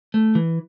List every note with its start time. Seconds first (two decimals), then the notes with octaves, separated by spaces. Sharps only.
0.14 A3
0.35 E3